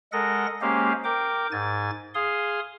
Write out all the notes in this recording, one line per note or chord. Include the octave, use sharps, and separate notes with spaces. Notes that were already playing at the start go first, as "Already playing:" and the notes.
G#3 A4 A#4 D#5 F#5 A#6
G#3 A#3 C#4 G4 C5 F5
A#4 G5 D6
G#2 G#5 A6
G#4 F5 C6 D#6